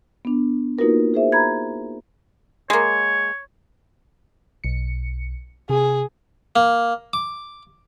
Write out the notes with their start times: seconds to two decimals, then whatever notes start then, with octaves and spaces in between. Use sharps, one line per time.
0.25 B3 D4
0.78 A#3 D#4 F4 F#4 A#4 B4
1.14 G#4 C5 E5
1.32 A#5 B5 G#6
2.70 G#3 A#3 C#5
4.64 B1 C#7
5.70 C3 G#4
6.56 A#3
7.13 D6